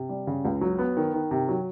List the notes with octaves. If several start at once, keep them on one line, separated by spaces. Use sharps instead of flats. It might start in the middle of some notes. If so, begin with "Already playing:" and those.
Already playing: C3
G3
C#3
C#2
F#3
B3
D#3
D#3
C3
F#3